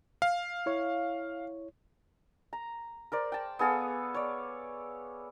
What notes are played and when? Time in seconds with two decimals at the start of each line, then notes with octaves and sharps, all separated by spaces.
0.22 F5
0.66 E4 C#5
2.53 A#5
3.12 A#4 C5 D5
3.32 G5 A5
3.59 B3 G#4 A4 F5
4.14 C#5 D5